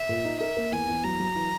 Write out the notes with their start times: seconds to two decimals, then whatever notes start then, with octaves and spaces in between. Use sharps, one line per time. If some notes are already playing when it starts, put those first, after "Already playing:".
Already playing: E5
0.09 A#2
0.25 D#4
0.40 A#4 E5
0.57 A#3
0.72 E2 G#5
0.88 E2
1.03 F#3 A#5
1.20 F#3
1.36 E3